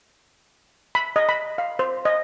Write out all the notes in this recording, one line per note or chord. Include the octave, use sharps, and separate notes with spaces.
B5
D#5
B5
F5
C5
D#5